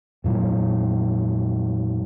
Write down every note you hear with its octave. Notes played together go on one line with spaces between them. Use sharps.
F2 A#2 F#3